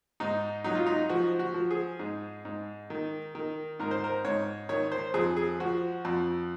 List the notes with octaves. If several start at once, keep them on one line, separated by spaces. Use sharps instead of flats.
G#2 D#4
F#3 D#4
F4
D#4
F3 F#4
F#4
F3
G#4
G#2
G#2
D#3
D#3
G#2 A#4
C5
A#4
G#2 C#5
D#3 C#5
C5
F2 G#4
G#4
F3 F#4
F2